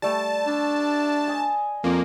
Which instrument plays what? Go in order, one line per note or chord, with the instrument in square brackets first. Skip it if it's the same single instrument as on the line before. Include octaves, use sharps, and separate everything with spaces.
[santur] G3 A3 [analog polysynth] A5
[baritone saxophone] D4
[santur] D#5 G#5
[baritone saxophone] F2 [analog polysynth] A#3